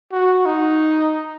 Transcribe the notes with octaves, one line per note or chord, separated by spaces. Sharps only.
F#4
D#4